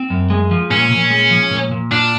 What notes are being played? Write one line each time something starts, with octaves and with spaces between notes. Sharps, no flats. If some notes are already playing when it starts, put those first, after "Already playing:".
Already playing: C4
F#2
G#3
F3
A#2 C#4
A#2
G#3
F3
A#2
A#2
D4 F4